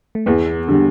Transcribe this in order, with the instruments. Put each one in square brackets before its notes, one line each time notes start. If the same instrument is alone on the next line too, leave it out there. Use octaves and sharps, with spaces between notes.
[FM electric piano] A3
[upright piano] E2 [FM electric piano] B3
[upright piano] D3 G3